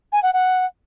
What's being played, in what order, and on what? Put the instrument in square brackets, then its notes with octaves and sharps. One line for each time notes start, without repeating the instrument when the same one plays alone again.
[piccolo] G#5
F#5
F#5